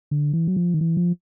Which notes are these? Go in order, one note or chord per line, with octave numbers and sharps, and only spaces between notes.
D3
E3
F#3
F3
D#3
E3
F3